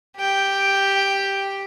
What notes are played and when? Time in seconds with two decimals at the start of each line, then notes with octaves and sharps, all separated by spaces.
0.17 G4 G5